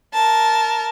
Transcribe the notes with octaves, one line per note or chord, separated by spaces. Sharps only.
A#4 A5